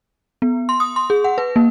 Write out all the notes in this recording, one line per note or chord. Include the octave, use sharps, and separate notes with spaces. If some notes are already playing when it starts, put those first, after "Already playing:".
B3
C6
D#6
C6
G#4
F#5
B4
A#3